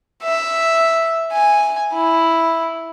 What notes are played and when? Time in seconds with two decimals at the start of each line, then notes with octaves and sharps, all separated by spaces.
0.23 E5
1.33 G#5
1.93 E4